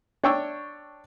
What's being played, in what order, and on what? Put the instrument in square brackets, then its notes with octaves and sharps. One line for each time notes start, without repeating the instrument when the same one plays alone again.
[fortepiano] D4 C#5 G5 C#6 E6